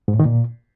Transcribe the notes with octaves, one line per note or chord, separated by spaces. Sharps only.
G#2
A2
D#3
A#2